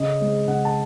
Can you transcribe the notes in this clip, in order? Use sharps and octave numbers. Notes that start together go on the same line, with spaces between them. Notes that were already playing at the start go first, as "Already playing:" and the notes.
Already playing: C#3 D#5
G#3 C4
C#3 F#5
A5